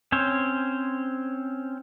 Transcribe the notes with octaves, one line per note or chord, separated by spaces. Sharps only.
C4 C#4 C5 C#5